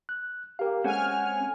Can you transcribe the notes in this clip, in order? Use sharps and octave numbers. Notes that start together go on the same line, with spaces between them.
F#6
G4 A#4 F5
G#3 C4 C#4 A4 F#5 G#5 F6